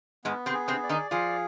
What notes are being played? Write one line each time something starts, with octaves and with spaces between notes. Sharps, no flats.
G#2 G#3 B3
C3 C4
G#4
C3 C4
D5
D#3 D#4
F3 F4 G#4